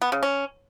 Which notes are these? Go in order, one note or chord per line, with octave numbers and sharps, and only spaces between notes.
B3
C#3
C#4